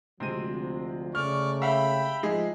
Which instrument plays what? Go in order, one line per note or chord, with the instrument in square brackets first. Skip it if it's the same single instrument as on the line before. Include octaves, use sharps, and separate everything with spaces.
[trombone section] D2 F3 [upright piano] C3 G#3 D#7 [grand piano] C4
[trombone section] C#3 A3 [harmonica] D5 C#6 [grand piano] F6
[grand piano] E5 F5 E6 [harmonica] G5 B5
[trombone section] F3 [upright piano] G#3 D#4 G#4